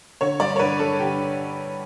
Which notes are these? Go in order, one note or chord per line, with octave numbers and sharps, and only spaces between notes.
D3 C#5
G2 D5
C#5
D3 B4
G2 A4
D3 G4